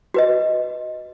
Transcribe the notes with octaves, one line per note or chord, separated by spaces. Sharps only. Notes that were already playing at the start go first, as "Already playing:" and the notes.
F#4 B4 D#5